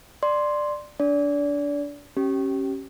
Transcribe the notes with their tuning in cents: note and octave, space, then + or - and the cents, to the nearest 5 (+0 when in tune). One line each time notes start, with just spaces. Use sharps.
D5 +10 C6 +0
D4 -20 D5 -30
C#4 -20 G4 -25